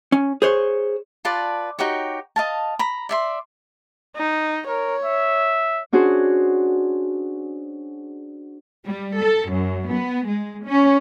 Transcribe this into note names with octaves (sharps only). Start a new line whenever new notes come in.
C#4
G#4 C5 C#5
F4 B4 D5 A5
D#4 F#4 G4 C#5
D#5 F5 A5
A#5 B5
D5 E5 C6
D#4
A#4 C#5
E5
C#4 D4 F#4 G#4 C5
G3
A4
F#2
B3
G#3
C#4